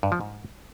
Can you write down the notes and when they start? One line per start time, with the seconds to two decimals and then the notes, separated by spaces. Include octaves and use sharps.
0.03 G2
0.12 F3
0.21 G#2